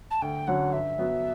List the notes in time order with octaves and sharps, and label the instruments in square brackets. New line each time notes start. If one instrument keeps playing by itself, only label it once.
[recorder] A5
[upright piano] D2 [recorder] G5
[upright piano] D3 F#3 C#4 [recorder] F#5
[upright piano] G2 [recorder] E5
[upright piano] F#3 B3 F#4